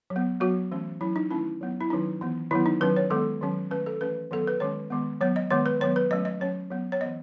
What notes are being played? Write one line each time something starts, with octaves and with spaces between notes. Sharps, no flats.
F#3
B3
F#3 B3 F#4
E3 A3 C#4
F#3 C#4 E4
D#4
D#3 A3 C#4 E4
F#3 B3
E4
D#3 F#3 C#4 D#4
E3 B3
D#3 F#3 B3 E4
D#4
D#3 F#3 C#4 B4
C#5
D#3 G#3 B3 A4
D#3 F#3 C#4
D#3 A3 C#4 B4
A4
E3 A3 C#4 B4
D#3 F#3 B3 A4
B4
D#3 G#3 C#4 C#5
D#3 G#3 B3
F#3 B3 C#5
D#5
D#3 G#3 B3 C#5
B4
D#3 F#3 B3 C#5
B4
F#3 A3 C#4 D#5
D#5
F#3 C#4 C#5
F#3 B3
C#5
E3 B3 D#5